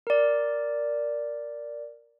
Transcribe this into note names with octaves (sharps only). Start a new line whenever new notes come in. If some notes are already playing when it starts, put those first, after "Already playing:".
A#4 D5